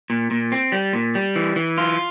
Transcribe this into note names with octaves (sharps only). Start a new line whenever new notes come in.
A#2
A#2
C4
G3
A#2
G3
E3
E3
F4